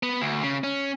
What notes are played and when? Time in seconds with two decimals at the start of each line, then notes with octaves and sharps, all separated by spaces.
0.03 B3
0.21 D2
0.43 C#3
0.64 C#4